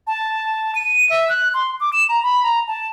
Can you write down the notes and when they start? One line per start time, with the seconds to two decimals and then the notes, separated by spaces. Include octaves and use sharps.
0.07 A5
0.75 D#7
1.10 E5
1.29 F#6
1.54 C6
1.80 D6
1.93 E7
2.09 A#5
2.23 B5
2.43 A#5
2.67 A5